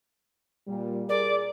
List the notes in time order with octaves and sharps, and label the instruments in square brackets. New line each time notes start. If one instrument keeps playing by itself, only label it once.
[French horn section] A#2 G3
[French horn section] G#4 A#4 [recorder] D5